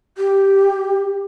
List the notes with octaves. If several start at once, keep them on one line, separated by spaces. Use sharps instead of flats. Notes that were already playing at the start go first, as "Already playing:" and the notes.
G4